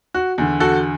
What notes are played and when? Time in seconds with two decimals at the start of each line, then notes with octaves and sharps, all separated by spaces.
0.14 F#4
0.38 E2 D3
0.60 F#4 A4